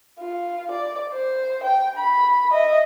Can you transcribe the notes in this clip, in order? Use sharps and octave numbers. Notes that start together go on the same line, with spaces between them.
F4
D5
C5
G5
B5
D#5 E5